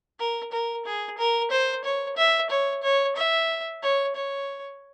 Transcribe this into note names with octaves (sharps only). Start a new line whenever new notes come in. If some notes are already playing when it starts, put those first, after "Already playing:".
A#4
A#4
G#4
A#4
C5
C#5
E5
C#5
C#5
E5
C#5
C#5